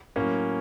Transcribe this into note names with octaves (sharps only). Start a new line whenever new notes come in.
A2 F#3 A#3 C#4